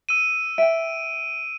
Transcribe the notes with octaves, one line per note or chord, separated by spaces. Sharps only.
E6 D#7
E5 G5 D7